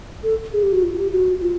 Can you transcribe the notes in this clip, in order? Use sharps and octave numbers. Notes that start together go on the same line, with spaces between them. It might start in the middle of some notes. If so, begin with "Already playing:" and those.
A4
G#4
G4
F#4
F4
G4
F#4
F4